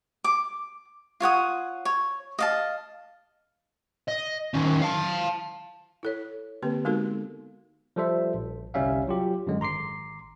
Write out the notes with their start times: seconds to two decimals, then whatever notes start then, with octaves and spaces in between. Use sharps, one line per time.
0.24 D6
1.20 F4 C#5 F#5 D#6
1.85 C#5
2.39 D#5 F5 A5
4.08 D#5
4.54 D#3 C#4
4.82 F5 A5
6.03 E4 A4 C#5
6.63 D3 A#3 C4 G4 B4
6.85 G#3 B3 D#4 F#4 A4 A#4
7.96 F3 G3 A4 C5 E5
8.34 A#1
8.74 G1 C2 G3 C#4 E5 F5
9.07 F#3 F4 G4
9.47 F#2 D3 G#3
9.60 G#1 A#5 C6 D6 C7